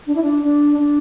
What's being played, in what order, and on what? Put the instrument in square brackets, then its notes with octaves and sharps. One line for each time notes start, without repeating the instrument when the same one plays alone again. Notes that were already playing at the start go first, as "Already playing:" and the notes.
[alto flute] D4
E4
D4
D4
D4